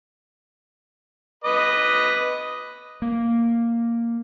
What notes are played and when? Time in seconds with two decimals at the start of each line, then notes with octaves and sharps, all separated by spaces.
1.44 B4 D#5 D6
3.02 A#3